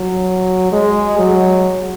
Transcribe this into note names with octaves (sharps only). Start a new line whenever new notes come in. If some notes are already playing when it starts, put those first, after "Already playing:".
Already playing: F#3
G#3
F#3